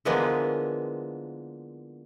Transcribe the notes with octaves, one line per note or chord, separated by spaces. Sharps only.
D3 E3 F3 G#3 A#3 B3